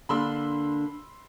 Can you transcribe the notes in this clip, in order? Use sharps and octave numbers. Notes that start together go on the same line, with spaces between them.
D3 A#3 D4 B5 C6 E6